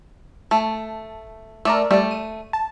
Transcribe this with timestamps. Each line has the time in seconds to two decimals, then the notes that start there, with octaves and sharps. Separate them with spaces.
0.51 A3 A5
1.65 A3 A#4 D5 E6
1.91 G3 A3 D5
2.11 D#7
2.53 A5